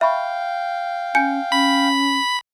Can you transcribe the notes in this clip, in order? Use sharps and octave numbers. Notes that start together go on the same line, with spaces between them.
E5 F5 G5 B5 C#6
C#4 G#5 G6 C#7
C#4 B5